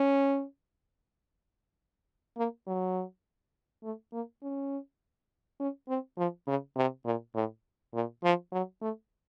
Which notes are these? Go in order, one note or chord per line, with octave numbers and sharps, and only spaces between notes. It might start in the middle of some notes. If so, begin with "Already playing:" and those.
Already playing: C#4
A#3
F#3
A3
A#3
C#4
C#4
C4
F3
C#3
C3
A#2
A2
A#2
F3
F#3
A3